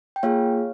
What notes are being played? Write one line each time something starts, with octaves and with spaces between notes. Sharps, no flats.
G5
A#3 F4 G#4 C#5 F5